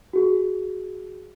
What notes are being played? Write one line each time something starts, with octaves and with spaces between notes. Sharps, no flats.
F#4 G#4